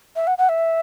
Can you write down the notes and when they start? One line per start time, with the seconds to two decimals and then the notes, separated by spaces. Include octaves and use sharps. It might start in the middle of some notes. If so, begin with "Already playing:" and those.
0.16 E5
0.27 F#5
0.38 F#5
0.49 E5